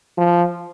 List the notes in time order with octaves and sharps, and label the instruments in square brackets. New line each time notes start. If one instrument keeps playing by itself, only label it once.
[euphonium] F3